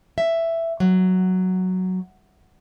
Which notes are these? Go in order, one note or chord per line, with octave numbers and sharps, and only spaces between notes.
E5
F#3